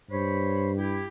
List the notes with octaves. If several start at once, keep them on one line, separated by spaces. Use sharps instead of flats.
G2 C5 C#5 B5
E4 G4